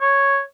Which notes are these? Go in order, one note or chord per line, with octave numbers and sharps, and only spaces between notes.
C#5